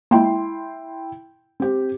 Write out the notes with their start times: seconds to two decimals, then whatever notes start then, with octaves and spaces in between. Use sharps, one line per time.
0.11 G#3 A#3 E4 G5 C6
1.60 C4 G4